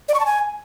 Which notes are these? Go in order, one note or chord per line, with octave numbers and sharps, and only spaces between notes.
D5
C#6
A5
G#5